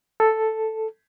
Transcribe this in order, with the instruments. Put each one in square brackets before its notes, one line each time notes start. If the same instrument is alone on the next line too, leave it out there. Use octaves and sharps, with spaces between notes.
[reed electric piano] A4